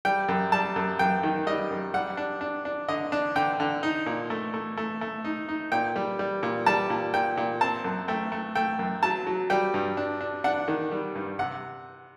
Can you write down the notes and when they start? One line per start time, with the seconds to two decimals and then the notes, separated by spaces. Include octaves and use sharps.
0.05 G3 G5
0.28 F#2
0.52 G3 A5
0.76 F#2
0.99 F#2 G5
1.23 D#3
1.47 G3 D#5
1.70 F#2
1.94 G3 F#5
2.17 D4
2.41 D4
2.65 D4
2.88 D3 D#5
3.12 D4
3.36 D3 G5
3.60 D3
3.83 D#4
4.06 A#2
4.30 A3
4.54 A3
4.77 A3
5.01 A3
5.24 D#4
5.48 D#4
5.72 A#2 G5
5.96 G3
6.19 G3
6.43 A#2
6.66 G3 A5
6.90 A#2
7.14 A#2 G5
7.37 A#2
7.61 C4 A5
7.84 F#2
8.08 A3 G5
8.32 A3
8.55 A3 G5
8.79 F#2
9.03 F#3 A5
9.27 F#3
9.50 G3 G5
9.74 G2
9.97 D4
10.21 D4
10.44 D4 F#5
10.68 D#3
10.92 G3
11.15 G2
11.39 C3 F#5